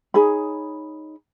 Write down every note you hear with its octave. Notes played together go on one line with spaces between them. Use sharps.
D#4 G#4 C#5 B5